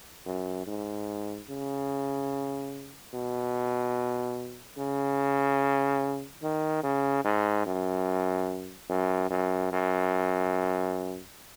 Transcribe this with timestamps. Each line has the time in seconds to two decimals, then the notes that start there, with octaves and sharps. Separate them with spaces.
0.26 F#2
0.66 G#2
1.49 C#3
3.14 B2
4.77 C#3
6.43 D#3
6.83 C#3
7.24 G#2
7.66 F#2
8.89 F#2
9.30 F#2
9.72 F#2